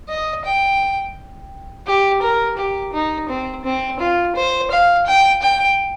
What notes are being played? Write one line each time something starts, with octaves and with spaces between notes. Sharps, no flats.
D#5
G5
G4
A#4
G4
D#4
C4
C4
F4
C5
F5
G5
G5